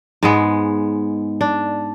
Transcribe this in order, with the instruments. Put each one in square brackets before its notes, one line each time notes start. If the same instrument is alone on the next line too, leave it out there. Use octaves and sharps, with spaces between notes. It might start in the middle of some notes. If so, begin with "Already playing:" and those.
[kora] G#2 G#3 B3
D4